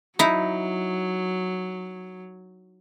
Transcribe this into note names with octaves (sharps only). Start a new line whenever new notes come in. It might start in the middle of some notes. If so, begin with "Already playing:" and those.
F#3 D#4 E4